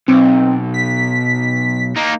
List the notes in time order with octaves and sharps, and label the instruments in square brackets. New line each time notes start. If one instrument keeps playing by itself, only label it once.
[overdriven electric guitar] B1 [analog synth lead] C4
[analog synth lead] B6
[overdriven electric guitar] A#3 D#4